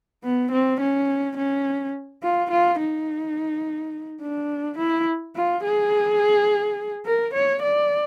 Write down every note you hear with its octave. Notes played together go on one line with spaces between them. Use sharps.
B3
C4
C#4
C#4
F4
F4
D#4
D4
E4
F4
G#4
A#4
C#5
D5